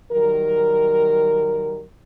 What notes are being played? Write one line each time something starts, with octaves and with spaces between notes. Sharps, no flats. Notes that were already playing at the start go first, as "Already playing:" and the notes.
D#3 F#3 G3 A#4